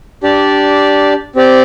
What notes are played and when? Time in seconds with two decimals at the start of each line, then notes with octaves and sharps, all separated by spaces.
0.23 D4 G4 D5
1.36 C4 G4 D5 G5